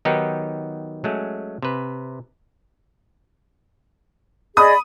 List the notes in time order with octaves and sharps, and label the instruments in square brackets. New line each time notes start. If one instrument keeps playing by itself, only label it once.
[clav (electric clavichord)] D#3 F#3 B3 D#4 G4
F#3 G#3 A3 C#4
C3 B4
[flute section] G#4 D5 D#5 [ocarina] B5 [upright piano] D#6